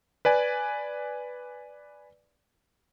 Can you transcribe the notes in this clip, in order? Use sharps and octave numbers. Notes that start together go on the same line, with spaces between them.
B4 D5 G#5